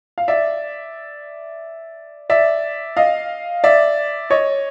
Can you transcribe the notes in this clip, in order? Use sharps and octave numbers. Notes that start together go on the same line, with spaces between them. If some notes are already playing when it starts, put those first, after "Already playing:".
F5
D5 E5
D5 E5
D#5 F5
D5 E5
C#5 D#5